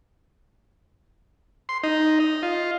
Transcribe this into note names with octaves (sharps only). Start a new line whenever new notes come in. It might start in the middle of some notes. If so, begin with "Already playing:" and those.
C6
D#4
D#5
F4